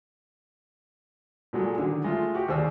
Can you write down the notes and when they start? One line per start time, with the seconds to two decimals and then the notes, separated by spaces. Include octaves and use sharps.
1.53 A#2 F#3 G#3 A4
1.78 D3 D#3 F#3
2.04 G#3 A3 F4
2.35 F#4 G4
2.48 D#2 G#4 C5 D5 E6